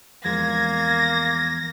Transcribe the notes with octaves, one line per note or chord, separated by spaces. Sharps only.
E2 F3 G#3 A#3 G#6 A#6